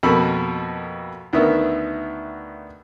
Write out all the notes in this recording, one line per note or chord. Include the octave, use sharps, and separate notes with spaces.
F2 B2 A#3 A4 B5
D2 D#3 B3 E5